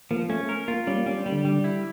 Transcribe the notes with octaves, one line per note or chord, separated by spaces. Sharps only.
F3 A#3
A3 C#4
A#4
A#3 F4
G3 C#4
A#3
G3 C#4
G3
D3
G3
E4